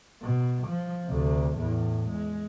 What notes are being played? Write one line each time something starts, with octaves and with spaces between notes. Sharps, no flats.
B2
F3
D2 C3
E2 A2
G#3